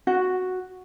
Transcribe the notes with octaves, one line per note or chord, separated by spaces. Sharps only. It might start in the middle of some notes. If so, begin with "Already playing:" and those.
F#4